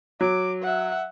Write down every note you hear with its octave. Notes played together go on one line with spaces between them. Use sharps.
F#3 D6
E5 F#5